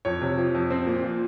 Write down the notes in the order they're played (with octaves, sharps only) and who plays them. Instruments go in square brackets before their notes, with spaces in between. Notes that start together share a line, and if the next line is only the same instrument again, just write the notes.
[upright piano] F2 C#5
C3
F3
F2
C4
A#2
F3